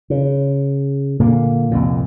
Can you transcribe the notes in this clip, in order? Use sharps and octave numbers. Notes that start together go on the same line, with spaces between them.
C#3
A#2 D3 A#3
C2 F2 A#2